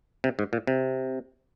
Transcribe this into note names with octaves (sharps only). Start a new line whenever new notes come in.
C3
G#2
A#2
C3